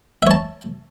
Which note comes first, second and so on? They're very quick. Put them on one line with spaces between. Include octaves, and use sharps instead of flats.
E5 C#5 A5